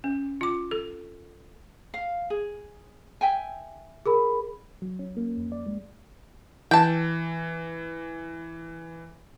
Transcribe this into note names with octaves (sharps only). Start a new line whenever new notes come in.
C#4
F4 D6
A4
F5
G#4
E5 G5 G#5
G#4 A#4 B5
F#3
C#4
A#3
F2
D5
G#3
E3 G5 A5